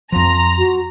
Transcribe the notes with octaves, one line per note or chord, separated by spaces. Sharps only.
F2 F3 A#5 C6
F#4